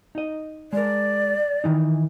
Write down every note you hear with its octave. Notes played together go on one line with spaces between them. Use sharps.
D#4 D#5
G#3 A#4 D5
D#3 E3 D#4